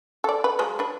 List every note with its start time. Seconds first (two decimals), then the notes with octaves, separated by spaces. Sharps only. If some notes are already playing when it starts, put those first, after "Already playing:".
0.24 A4 D5
0.44 B4
0.59 F3 F#3 G#3
0.79 D4 B4